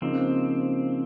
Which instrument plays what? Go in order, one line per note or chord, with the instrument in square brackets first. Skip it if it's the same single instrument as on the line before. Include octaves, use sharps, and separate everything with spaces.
[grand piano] C#3 F3 A#3 D#4 [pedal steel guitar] C4